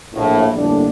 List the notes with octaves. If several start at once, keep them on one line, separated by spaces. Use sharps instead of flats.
A#1 A2
G1 F2 A2 A#3 D4